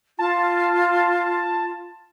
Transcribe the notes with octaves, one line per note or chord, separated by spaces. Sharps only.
F4 A5